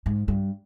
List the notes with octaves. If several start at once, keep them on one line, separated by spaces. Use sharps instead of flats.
G#2
G2